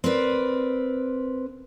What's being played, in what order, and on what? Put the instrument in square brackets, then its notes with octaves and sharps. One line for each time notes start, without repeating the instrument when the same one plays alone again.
[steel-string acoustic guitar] C4 A#4 B4 D5